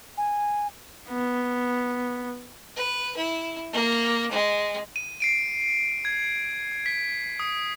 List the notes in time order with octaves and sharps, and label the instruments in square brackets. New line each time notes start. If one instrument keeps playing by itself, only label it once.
[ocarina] G#5
[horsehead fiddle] B3
[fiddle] B4
E4
A#3
G#3
[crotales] D#7
C7 D7 D#7
G#6
B6
D#6